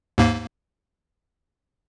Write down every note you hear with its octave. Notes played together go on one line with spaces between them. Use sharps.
D#2 G#2 A#3